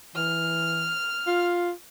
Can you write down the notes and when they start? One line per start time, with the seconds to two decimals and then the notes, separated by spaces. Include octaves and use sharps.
0.16 E3 F6
1.27 F4